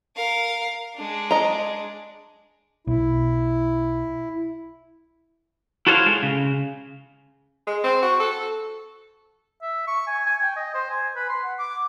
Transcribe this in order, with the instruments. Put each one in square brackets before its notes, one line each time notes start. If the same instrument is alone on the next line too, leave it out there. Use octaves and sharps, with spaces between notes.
[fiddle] A#4 F5
G#3 D4
[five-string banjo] D#5 A#5
[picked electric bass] B1 [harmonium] E4
[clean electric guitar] E4 F#4 A4 C5 C#5 F5
G#3
C#3
[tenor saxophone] G#3
C4
F#4
A4
[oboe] E5
C#6
G#5
G#5
G5
D#5
C5
G#5
B4
C6
F#5
D6